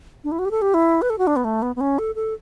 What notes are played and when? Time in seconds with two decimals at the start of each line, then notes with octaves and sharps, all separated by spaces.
0.24 D4
0.32 E4
0.39 F#4
0.45 G4
0.51 A4
0.62 G4
0.74 E4
1.02 B4
1.10 A4
1.18 F#4
1.27 D4
1.36 B3
1.44 A3
1.62 B3
1.76 B3
1.81 C#4
1.98 A4
2.15 A4